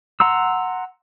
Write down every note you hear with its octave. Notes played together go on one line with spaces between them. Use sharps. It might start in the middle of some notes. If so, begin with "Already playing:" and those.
F#5 A#5 C6 E6